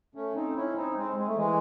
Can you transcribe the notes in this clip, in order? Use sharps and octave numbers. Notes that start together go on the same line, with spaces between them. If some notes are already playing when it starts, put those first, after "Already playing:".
A3 C#4
C4 D#4
C#4 E4
C4 D#4
G#3 C4
G#3
A3
E3 G#3